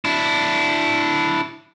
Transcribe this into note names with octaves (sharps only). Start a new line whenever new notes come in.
D4 E4